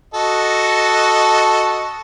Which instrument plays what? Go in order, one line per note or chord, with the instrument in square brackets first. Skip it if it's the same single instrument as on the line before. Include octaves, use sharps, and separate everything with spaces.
[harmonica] F#4 A4 D#5